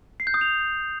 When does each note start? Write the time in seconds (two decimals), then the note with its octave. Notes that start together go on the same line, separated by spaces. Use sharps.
0.20 C7
0.27 G6
0.34 D#6
0.41 F7